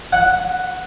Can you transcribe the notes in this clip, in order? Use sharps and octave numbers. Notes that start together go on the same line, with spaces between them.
F#5